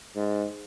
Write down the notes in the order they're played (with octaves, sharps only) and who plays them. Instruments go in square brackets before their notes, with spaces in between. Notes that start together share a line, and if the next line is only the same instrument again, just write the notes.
[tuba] G#2